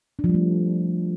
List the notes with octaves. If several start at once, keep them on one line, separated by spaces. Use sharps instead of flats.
D4
F3
G3
A3